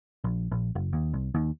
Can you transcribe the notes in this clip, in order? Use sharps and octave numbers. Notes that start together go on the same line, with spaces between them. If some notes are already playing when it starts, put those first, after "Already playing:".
A#1
A#1
F#1
D#2
C2
D#2